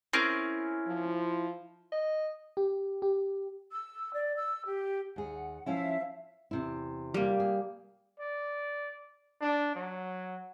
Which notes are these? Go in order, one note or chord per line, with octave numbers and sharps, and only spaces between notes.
C4 C#4 E4 G#4 A#4
F3
D#5
G4
G4
E6
D5
E6
G4
D#2 G#4 F#5
F3 C#4 E4 E5 F5
E2 C3 E4
G3 A#3
G#4
D5
D4
F#3